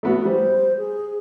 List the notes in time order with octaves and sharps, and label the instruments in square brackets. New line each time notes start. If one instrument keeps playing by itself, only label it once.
[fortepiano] A3 B3 F#4
[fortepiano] G3 [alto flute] C5
[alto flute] G#4